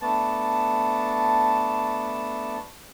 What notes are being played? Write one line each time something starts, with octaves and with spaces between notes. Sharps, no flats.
A3 B3 D4 A5